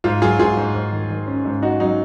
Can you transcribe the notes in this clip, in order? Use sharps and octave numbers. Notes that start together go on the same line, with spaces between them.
G#2 F4
F#3 F4 G#4
G#2 F4 G#4
G#2
G#2
D#3
D#3
C#4
G#2
C#4 D#4 F#4
F#3 D#4